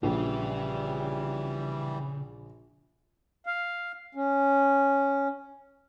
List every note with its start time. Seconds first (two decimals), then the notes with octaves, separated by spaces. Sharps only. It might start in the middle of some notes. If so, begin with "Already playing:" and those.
0.03 A#1 C#3 E3 G3
3.46 F5
4.15 C#4